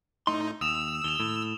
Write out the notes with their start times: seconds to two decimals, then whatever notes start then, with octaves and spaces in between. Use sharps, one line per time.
0.27 A2 A3 D#4 C6
0.61 D#2 D#6 E6 E7 F7
1.04 D#2 E7 F7 G7
1.20 A2